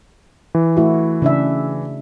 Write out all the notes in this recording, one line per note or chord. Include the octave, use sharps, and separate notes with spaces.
E3
A3 E4 F#4
C#3 D4 E5